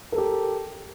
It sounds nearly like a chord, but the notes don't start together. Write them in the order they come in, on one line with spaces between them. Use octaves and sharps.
A#4 A4 G4